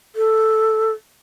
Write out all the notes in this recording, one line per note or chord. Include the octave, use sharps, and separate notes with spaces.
A4